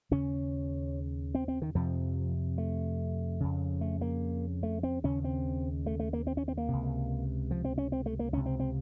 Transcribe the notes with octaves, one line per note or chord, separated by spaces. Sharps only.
D#2 C#3 C#4
C4
C4
D#3
F2 C3 F3
A3
F2 C#3
A3
A#3
A3
C4
D#2 C#3 C#4
C4
A3
A3
A#3
C4
C#4
C4
A#3
C#2 C3
F3
C4
C#4
C4
A3
A#3
C#2 C3 C#4
C4
C4